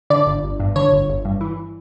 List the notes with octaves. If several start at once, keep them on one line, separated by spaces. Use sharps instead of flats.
D3 D5
G1
G1
G2
D3 C#5
G1
G1
G2
E3